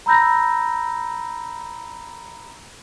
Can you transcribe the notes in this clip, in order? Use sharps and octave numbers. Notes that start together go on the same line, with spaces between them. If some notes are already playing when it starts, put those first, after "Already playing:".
A#5 B5 E6 G6 A#6